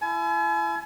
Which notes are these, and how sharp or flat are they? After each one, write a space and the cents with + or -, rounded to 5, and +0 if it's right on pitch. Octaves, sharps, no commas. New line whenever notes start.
E4 +30 G#5 +40